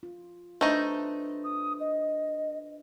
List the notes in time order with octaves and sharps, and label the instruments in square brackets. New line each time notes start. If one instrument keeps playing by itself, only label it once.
[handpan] F4
[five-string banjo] A3 D#4 [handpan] D4 B4 C5
[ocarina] D#6
D#5